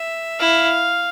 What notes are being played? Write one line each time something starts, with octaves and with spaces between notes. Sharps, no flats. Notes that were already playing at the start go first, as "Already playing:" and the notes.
Already playing: E5
E4 F5